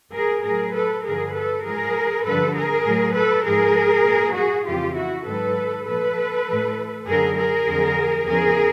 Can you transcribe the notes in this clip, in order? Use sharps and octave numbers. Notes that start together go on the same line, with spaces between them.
G#4 A#4
A2 F#3 G#4 A#4
A4 B4
G2 D3 F3 G#4 A#4
A4 B4
G#2 F3 G#4 A#4
G2 D3 F3 A4 B4
G#4 A#4
A2 F#3
A4 B4
G#2 F3 G#4 A#4
A#2 F#3
F#4 G#4
F2 C#3 E3 F4 G4
E4 F#4
G#2 D#3 F#3 A4 B4
A#2 F3 A4 B4
A2 E3
F#2 D3 F#3 G#4 A#4
G#4 A#4
F2 D3 F#3
E2 C#3 F3 G#4 A#4